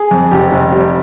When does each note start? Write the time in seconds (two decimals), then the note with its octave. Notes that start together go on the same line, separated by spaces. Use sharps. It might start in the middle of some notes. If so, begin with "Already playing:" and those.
Already playing: G#4
0.11 F2
0.31 F1 G4
0.52 F1
0.72 G3